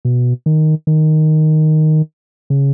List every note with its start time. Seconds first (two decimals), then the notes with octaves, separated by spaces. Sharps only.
0.05 B2
0.46 D#3
0.87 D#3
2.50 C#3